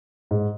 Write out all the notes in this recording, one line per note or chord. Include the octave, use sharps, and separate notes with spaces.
G#2